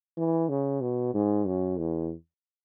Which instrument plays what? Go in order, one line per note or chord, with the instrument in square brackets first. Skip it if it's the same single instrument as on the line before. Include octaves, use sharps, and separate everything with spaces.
[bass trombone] E3
C#3
B2
G#2
F#2
E2